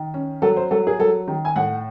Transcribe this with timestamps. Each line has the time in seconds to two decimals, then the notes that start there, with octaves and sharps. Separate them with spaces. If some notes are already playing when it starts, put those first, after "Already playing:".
Already playing: D#3
0.14 C#4
0.42 F#3 A4
0.57 C5
0.71 F#3 A4
0.87 G#4
0.99 F#3 A4
1.28 D#3
1.45 G#5
1.56 A2 F#5